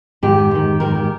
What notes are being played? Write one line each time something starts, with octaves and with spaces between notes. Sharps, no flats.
G#2 D#3 G4
G#2 D#3
G#2 D#3 A#4
G4